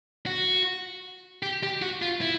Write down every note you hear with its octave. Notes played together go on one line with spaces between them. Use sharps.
F#4
G4
G4
F#4
F4
E4